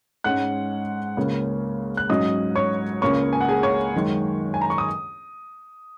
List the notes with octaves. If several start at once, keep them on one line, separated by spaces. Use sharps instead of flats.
G#2 G#3 C#4 F#5 F#6
C#2 C#3 A#3 C#4
F#6
G#2 F#3 C#4 D#5 D#6
C#5 C#6
C#2 C#3 A#3 C#4 C#5 C#6
G#5
F#5
G#4 G#5
C#5 C#6
F#2 D#3 G#3
G#5
A#5
C#6
D#6